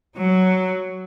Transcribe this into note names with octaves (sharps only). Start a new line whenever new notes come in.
F#3